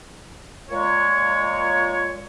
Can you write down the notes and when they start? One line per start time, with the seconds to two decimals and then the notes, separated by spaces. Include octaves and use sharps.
0.70 A#2 G#3 C#5